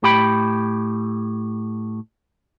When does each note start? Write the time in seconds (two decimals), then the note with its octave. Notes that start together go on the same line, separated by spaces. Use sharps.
0.03 A2 G4 G5 B5